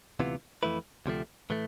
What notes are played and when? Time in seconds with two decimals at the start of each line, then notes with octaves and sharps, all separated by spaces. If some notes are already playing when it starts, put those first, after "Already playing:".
0.20 D2 C3 E3 B3 F4
0.63 F2 E3 A3 E4 B4
1.06 D2 C3 F3 A3 C4
1.50 A2 E3 A3